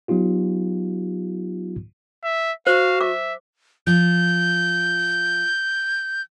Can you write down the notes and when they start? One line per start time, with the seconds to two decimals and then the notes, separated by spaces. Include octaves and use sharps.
0.08 F#3 B3 D#4 F4 G4
2.24 E5
2.67 F#4 C5 F5
3.01 E5 D6
3.87 F3 G6